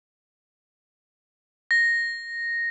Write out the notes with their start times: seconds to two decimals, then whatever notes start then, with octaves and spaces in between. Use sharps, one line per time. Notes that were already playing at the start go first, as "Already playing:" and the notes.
1.71 A#6